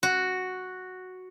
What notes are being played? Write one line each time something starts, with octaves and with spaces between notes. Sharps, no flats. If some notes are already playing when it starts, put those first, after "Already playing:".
F#4